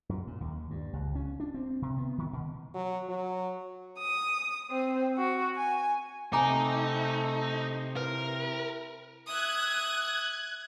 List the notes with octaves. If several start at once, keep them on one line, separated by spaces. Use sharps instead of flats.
F#2
A#2
D#2
G2
C#2
C#4
D4
C4
C3
B3
D#3
B2
F#3
F#3
D#6
C4
F#4
G#5
C3 A3 D#4 G#5 A#5 D6
E4 A#4 B4
E5 D#6 F#6 G#6